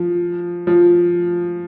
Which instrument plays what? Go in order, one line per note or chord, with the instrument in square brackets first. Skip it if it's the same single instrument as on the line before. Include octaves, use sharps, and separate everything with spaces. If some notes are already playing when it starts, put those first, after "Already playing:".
Already playing: [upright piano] F3
F3